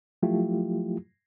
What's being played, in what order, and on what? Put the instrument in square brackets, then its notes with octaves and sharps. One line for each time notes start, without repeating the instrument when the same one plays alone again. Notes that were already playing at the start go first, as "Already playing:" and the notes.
[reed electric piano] F3 F#3 A3 E4 F4 G4